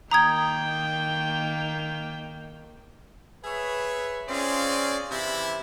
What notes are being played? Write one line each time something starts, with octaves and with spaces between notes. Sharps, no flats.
D#3 A#3 G5 A#5 D#6 G#6
G#4 B4 C#5 E5
C4 C#4 F4 G#4 D5
C3 E3 E4